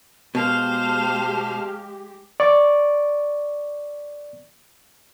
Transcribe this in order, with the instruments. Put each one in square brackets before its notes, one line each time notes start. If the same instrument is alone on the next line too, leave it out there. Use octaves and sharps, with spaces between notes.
[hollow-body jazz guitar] B2 [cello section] G#3 G4 [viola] C5 F5 [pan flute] A5
[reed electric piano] D5 C#6 D6